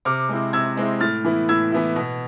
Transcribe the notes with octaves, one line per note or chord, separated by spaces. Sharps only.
C3 D6 F6
G#3 C4 E4
C3 E6 G#6
G#3 C4 E4
A2 F6 A6
E3 B3 E4
A2 E6 G#6
E3 B3 E4
B2